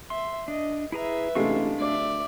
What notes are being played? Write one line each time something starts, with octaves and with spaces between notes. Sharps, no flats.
E5 C6
D4 D#5
E4 G#4 B4 E5 A#5
A1 C3 G#3 A3 D4 F5 C#6
D2 D5 E5